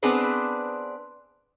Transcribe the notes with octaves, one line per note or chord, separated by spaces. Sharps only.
B3 C4 D4 G#4 B4 C5